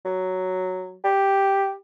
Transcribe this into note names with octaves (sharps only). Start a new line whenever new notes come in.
F#3
G4